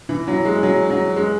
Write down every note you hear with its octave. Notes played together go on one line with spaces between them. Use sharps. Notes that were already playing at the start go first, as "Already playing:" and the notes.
E3
F#3
G#3
F#3
F#3
G#3